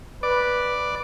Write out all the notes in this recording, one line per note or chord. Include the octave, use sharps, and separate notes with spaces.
B4 D5